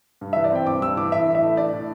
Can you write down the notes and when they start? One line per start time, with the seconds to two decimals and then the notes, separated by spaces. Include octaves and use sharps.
0.21 G2
0.33 E3 E5
0.44 D5
0.52 C4 G5
0.67 G2 D6
0.82 G2 E6
0.97 E3 D6
1.12 A2 E5
1.27 E3
1.35 E5
1.42 A3
1.57 D4 D5
1.73 A2